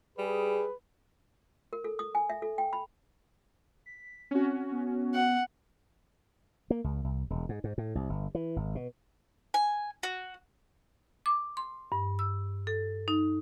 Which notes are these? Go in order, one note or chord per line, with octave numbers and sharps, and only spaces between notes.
G3 G#4 B4
A#4
A4
D#6
G#5
E5
A4
G5
B5
B6
C4 C#4 F#4
B3
F#5
A#3
C#2
C2
E1
G#2
G#2
A2
C2
G1
E3
G#1
B2
G#5
F#4
D6
C6
G2
E6
A4
D#4